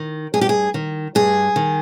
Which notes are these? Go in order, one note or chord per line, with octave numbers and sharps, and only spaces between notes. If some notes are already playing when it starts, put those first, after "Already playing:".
Already playing: D#3
G2 G#4
G4
G#4
D#3
G2 G#4
D#3